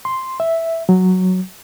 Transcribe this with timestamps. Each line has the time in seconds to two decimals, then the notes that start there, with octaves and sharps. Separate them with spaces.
0.05 C6
0.40 E5
0.89 F#3